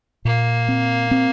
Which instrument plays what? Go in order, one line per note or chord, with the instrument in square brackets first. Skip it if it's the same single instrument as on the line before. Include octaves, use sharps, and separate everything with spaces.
[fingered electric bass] A#2 [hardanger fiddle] A#3
[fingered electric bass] C4
C4